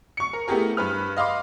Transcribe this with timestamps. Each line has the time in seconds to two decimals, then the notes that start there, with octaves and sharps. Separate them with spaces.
0.17 C#6 C#7
0.33 A#4
0.48 A3 B3 E4 G4 G#4 A#4
0.77 G2 B4 F6
1.17 D#5 F5 B5 C6 D6